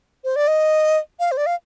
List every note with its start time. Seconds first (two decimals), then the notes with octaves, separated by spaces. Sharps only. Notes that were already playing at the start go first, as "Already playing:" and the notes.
0.24 C5
0.36 D5
0.48 D#5
1.20 F5
1.32 C5
1.37 D5
1.46 F5